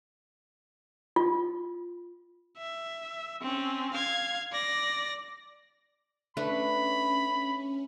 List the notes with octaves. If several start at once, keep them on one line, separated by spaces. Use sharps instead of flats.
F4
E5
C4 C#4
F5 G#6
D5 A#6
A3 C#4 D4 B4 B5